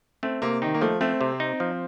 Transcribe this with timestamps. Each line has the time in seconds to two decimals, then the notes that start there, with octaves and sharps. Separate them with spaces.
0.23 A3 C4
0.42 C3 A#3
0.62 D#3 D#4
0.74 A#3
0.81 F3 A3
1.01 A3 C4
1.21 C3
1.40 D#4
1.60 F3